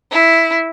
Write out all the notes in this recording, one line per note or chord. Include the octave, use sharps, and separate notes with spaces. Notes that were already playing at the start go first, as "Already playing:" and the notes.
E4